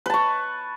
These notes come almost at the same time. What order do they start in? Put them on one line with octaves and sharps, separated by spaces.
B4 A5 C#6